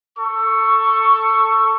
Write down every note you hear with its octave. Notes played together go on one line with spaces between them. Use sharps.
A4 C#6